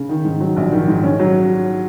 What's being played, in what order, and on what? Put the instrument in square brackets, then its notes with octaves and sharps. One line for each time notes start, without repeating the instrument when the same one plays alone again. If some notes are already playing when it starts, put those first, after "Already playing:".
Already playing: [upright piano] C#3
D#3
G#2
F#3
A#1
D#3
G#2
C#4
F#3